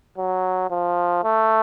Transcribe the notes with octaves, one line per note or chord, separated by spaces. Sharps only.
F#3
F3
A3